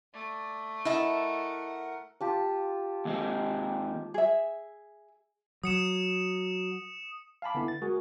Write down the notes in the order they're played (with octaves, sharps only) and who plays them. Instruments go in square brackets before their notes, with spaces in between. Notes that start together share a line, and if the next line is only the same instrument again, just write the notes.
[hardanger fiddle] A3 [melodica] D5
[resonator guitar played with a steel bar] E4 [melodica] A#4 F#5 [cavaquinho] D#5 E5 A5
[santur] F4 G4 A5
[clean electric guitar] D#2 G#3 C4
[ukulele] G#4 E5
[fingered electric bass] F#3 [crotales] D#6 C#7 E7
[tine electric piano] F5 G#5 A5 B5 D6
D3 B3 E4
A6
G#3 F#4 G#4 A#4